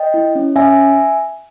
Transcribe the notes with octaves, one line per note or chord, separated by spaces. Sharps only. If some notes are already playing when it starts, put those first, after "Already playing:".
Already playing: D#5 G5
E4
C#4
C#4 E5 G#5